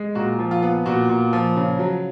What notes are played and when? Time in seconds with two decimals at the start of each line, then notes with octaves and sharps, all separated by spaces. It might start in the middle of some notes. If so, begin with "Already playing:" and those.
Already playing: G#3
0.15 A#2 F#4
0.39 F3
0.51 F4
0.62 B3
0.86 A#2 F#4
1.09 A#2
1.33 F3
1.56 C#3
1.79 F#3